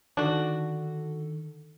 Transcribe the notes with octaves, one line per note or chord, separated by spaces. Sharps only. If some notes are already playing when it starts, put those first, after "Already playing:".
D3 D#3 D4 F#4 A4